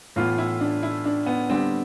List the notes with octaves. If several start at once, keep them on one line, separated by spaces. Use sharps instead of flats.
A2 E3 B3 F4
E4
D4
E4
D4
B3
D3 G3 B3 C4